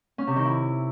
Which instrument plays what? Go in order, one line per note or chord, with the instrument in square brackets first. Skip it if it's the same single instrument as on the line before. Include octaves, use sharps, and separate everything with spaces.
[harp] C#4
C3
D#3
E4